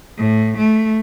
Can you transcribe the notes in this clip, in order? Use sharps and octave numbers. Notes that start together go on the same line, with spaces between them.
A2
A3